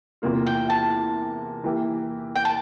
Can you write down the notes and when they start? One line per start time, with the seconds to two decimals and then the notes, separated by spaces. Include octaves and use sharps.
0.22 E2 C3 E3 A#3 F4
0.46 G5
0.70 A5
1.64 E3 A#3 E4 G4
2.35 G5
2.45 A5